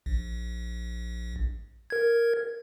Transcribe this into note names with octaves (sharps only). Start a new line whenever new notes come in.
A#1
A#4 G#6